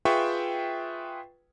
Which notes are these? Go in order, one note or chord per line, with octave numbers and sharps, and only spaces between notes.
F4 G#4 B4 E5 G5 C#6